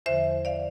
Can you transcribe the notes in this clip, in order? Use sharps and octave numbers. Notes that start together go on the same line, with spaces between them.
E2 D3 F3 C5 E5
D5 F5